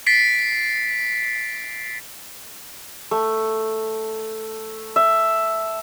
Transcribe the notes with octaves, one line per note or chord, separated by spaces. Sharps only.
A6 B6 C7 D7
A3
E5